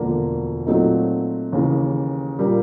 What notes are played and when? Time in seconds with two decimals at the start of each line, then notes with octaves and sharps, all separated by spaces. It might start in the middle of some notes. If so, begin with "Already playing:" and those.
Already playing: E1 D2 D3 F3 A#3
0.66 A#2 F#3 A3 C4 D#4
1.53 D#2 C#3 E3
2.39 A#2 G3 A#3 D4